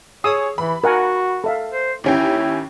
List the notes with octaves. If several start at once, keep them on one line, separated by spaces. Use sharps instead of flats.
G#4 C#5 D#6 E6
E3 B5
F#4 A#4 F#5 G#5
A4 E5 F5
C5
D#2 C#4 E4 G5